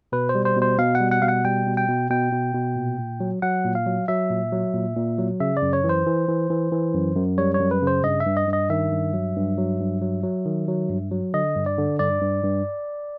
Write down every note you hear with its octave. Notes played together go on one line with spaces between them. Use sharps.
B2 B4
C5
G3
C5
B2
C5
B2 F5
F#5
G3
F#5
B2 F5
F#5
G3 G5
B2
G5
B2
B2 G5
B2
B2
A#2
A#2
F#3
F#3 F#5
A#2
F5
F#3
F#3 E5
A#2
F#3
A#2
A#2
F#3
C#3 E5
D5
F#2
C#5
E3
C5
E3
E3
E3
E3
F#2
F#2
G3 C#5
C#5
F#2
B4
C#3
C5
G2 D#5
E5
G2
D#5
G2
D#5
D#3 E5
G2
F#3
G2
F#3
G2
F#3
F#3
D#3
F#3
G2
F#3
D3 D#5
G2
D5
D3
G2 D5
G2
G2